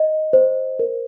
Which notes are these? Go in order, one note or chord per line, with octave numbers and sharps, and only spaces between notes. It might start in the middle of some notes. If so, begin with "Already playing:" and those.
Already playing: D#5
C5
A#4